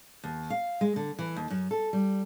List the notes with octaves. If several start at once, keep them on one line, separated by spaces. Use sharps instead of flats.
D#2
F5
G#3
D3
E3
D#2
F#2
A4
G3